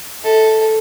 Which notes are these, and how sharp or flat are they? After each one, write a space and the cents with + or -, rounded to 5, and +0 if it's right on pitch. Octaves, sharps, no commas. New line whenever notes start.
A4 +0 E5 -35